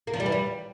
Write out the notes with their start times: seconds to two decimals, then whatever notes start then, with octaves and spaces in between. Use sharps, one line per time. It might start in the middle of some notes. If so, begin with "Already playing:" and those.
0.07 A#3
0.14 F3
0.20 G3
0.26 E3
0.32 G3